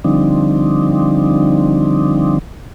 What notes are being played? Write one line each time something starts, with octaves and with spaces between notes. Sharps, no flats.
D3 F3 G3 C4 D4 D#4